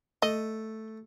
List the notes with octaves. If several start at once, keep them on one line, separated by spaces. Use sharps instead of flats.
A3 D#5